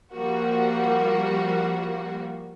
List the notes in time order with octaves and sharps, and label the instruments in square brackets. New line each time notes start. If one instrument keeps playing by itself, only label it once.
[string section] F3 G3 A#3 F#4